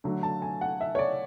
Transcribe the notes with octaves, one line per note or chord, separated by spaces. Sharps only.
D3 F#3 A3
A5
G#5
F#5
E5
C#5
D5